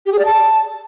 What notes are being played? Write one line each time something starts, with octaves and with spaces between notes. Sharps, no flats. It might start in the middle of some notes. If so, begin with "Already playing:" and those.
G4
G#4
D5
A5